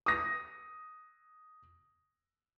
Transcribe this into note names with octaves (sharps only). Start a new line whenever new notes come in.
D#6 A#6